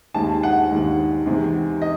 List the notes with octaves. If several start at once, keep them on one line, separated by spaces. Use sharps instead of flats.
D#2 D#3 G#3 A5
F#5
D#2 D#3 G#3
E2 C3 D#3 G#3
D#5